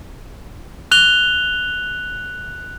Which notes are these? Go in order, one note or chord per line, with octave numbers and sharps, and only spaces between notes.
F#6 F7 G7